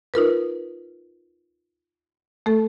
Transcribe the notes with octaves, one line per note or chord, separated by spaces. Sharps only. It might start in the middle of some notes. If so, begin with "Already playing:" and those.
D#4 F4 A#4 B4
A3 A4